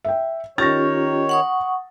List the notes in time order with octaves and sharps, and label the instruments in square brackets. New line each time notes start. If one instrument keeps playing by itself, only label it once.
[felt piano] E5 G5
[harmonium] D#3 C#5 [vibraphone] C#4 F4 G4 [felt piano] A6 A#6
[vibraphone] F#5 C#6 D#6